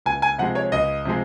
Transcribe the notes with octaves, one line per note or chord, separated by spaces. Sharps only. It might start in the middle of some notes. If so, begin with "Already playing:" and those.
C#2 G#5
G#5
C3 F3 G#3 F#5
C#5
C#2 D#5
C3 F3 G#3